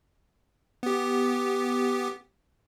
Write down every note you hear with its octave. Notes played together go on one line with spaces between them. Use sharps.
B3 G4